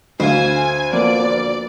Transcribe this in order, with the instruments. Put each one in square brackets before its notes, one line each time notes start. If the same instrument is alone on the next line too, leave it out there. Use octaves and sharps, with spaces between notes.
[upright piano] D2 F5 [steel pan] D3 [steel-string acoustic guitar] C5 [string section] G#5
[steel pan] F3 A#3 B3 [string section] D5